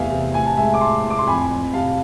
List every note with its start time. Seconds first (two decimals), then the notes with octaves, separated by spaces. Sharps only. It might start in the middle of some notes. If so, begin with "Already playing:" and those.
Already playing: E2 C3 A3 E5 F5 G#5
0.10 C3
0.34 A2 G#5
0.46 A5
0.57 G#3 E5 G#5
0.74 D6
0.81 A2 A5 C6
1.03 A2
1.10 D6
1.18 C6
1.27 F2 G#5 B5
1.50 F2
1.73 C3 F5 A5